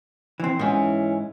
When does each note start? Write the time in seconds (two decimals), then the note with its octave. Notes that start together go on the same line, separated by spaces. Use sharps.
0.40 E3 C4
0.59 G#2 E3 C#4